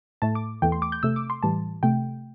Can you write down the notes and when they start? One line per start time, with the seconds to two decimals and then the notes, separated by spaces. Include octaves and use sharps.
0.22 A2 A3 A5
0.35 D6
0.62 E2 E3 A3 G5
0.72 C6
0.82 D6
0.92 G6
1.03 C3 A3 E6
1.16 D6
1.30 C6
1.43 A2 E3 G3 A5
1.83 C3 A3 G5